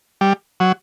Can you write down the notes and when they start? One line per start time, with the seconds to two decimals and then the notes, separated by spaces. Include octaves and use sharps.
0.21 G3
0.60 F#3